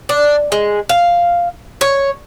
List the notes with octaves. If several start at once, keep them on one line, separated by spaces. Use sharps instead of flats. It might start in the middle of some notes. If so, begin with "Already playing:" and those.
D4
G#3
F5
C#5